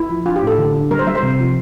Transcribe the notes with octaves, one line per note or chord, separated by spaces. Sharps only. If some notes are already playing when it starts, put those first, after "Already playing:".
Already playing: E4
F3
D4 F4
G4
A2
A4
D3
D4
G3 A#4
C5
G3 E5
C5
C3
F3